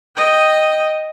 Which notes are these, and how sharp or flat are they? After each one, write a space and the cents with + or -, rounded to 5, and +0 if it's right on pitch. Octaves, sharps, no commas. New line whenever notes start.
D#5 +0 G5 +0